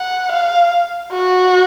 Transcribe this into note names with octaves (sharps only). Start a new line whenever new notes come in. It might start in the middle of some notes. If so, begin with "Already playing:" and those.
Already playing: F#5
F5
F#4